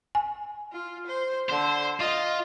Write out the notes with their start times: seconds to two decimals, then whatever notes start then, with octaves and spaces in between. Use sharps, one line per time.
0.15 G#5
0.72 F4
1.07 C5
1.50 D3 C5
2.00 F4 D#5